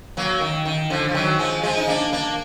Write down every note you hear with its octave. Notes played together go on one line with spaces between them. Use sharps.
F#3 A#3
D#3
D#3
D3 F3
F3
D#3 F#3
F3 G#3
F3 G#3
D#4
A#3 D4
A#3 D4